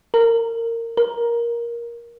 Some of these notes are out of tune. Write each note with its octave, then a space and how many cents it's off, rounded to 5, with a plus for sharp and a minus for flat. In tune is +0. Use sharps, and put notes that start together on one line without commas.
A#4 -20
A#4 +15